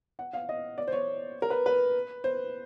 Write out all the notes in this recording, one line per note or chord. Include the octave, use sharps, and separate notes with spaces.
F#5
F5
D#5
D5
C5
C#5
A#4
B4
B4
C5